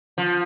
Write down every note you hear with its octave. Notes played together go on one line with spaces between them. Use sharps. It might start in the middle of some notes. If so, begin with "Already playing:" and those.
F3